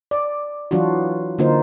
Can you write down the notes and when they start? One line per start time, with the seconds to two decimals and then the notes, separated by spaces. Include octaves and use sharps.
0.11 D5
0.71 E3 F#3 D4 F4 F#4
1.39 D3 A#3 D#4 F4 C5